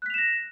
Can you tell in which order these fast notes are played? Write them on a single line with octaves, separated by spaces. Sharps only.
F#6 B6 F7 E7 A#6